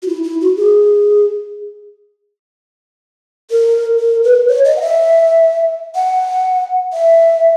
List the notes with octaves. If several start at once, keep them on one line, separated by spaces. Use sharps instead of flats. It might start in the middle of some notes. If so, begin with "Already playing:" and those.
F#4
E4
E4
F#4
G#4
A#4
A#4
B4
C#5
D#5
F#5
E5
F#5
E5